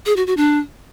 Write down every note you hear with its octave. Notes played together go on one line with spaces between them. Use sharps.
G#4
F#4
F#4
D4